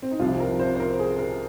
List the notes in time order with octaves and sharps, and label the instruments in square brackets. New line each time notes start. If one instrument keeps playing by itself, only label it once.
[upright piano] C4
D#4
C2 C3 F3 F4
A#4
C5
C5
A#4
G#4
A#4